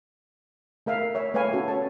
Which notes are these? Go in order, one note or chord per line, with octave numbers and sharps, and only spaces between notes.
A3 A#4 E5 F5
C#5 E5
A3 B4 C#5 F5 G#5
C#4 F#4 A4
C#5 A5